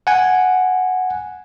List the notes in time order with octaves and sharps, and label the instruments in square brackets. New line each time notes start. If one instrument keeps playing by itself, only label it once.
[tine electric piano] F#5 G#5